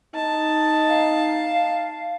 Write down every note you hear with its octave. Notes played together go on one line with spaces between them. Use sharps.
D#4 A5
F5